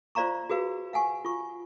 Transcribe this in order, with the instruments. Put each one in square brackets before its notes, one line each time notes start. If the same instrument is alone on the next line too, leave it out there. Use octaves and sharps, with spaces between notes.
[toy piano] F4 C5 D5 F5 A#5 C#6
F#4 G#4 B4 F5
F5 F#5 G#5 C#6
F4 C#6